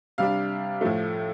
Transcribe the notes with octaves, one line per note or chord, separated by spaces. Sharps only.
C3 G3 D4 F5
A2 F3 A3